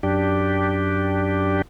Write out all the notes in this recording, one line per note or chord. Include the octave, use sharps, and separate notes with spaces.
F#2 D4 G4